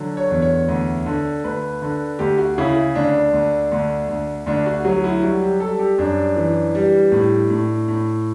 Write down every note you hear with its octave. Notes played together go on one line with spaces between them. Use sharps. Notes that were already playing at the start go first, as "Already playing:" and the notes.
Already playing: D3 F#3
C#5
E2
C#5
D2
D3
D2 B4
D3
D2 G4
F#4
C#3 E4
D2 D4
D2
D2
D2
D2 D4
F#4
F#3 F#4
E4
G3 F#4
G4
G3 A4
G4
F#2 D4
E3
G3
A2
A2
A2